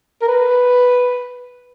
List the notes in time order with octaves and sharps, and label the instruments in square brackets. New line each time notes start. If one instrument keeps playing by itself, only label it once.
[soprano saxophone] A#4
B4